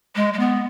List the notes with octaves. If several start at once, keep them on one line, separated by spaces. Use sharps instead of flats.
G#3
G#3
B3